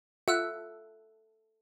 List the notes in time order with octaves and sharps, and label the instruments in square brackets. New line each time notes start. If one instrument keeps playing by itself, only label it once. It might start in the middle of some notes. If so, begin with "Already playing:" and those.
[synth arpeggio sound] F4 [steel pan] A4 E5 [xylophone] F#5 E6 F#6